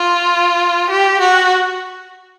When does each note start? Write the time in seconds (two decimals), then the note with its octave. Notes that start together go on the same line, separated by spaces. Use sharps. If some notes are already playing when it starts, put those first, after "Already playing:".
Already playing: F4
0.90 G4
1.21 F#4